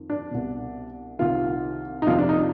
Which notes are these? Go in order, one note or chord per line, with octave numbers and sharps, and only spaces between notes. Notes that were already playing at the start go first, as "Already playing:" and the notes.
Already playing: F2 D#3
D4
C2 B2
C2 C3 D#3 F4
D#4
F2 C3 F3 F4
D4
D#4